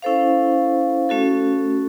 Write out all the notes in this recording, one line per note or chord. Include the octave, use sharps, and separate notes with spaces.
C#4 E4 A4 C5 F5
A3 C#4 F#4 A4